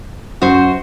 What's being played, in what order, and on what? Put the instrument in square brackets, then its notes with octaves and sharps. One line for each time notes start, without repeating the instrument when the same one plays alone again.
[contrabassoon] F#2 [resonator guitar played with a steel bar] F#4 C5